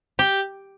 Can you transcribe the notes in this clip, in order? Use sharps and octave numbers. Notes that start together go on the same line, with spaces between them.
G4